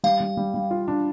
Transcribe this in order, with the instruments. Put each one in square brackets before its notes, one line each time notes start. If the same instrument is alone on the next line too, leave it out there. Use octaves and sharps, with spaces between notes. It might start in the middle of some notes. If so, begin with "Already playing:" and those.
[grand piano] G3 [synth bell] F5
[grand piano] G3
G3
G3
F4
D4